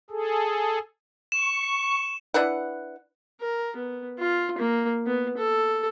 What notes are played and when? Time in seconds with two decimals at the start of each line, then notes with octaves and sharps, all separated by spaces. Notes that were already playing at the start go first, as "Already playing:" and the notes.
0.10 G#4 A4
1.32 C#6 E7
2.34 D4 E4 B4 F#5
3.41 A#4
3.76 B3
4.19 F4
4.58 A#3
5.06 B3
5.37 A4